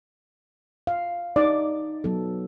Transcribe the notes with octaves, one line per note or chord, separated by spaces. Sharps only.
F5
D#4 D5
F#3 B3 A4